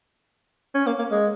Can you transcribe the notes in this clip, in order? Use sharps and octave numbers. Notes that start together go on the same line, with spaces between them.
C#4
A#3
A#3
G#3